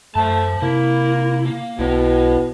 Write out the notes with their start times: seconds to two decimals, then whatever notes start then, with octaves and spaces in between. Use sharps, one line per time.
0.15 F#2 A3 C5 A5
0.62 C3 A#3 E4
1.45 A#3
1.79 B1 B2 B3 E4 C#5